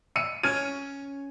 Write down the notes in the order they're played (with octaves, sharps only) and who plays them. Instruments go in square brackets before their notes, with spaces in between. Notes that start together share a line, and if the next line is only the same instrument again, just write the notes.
[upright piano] E6 C#7 D#7
[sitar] C#4 [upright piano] F6 G#6 D#7